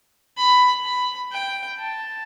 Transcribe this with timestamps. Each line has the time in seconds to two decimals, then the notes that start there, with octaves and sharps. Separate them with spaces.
0.37 B5
0.84 B5
1.32 G5
1.79 A5